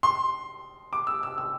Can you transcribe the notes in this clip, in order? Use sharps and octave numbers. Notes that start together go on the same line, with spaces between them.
C6
D6
E6
E6
E6